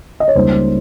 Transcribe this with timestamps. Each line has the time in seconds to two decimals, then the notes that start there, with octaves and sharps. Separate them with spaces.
0.20 D#5
0.28 C#5
0.35 C#2 C#3 G3 A#3 D#4 C5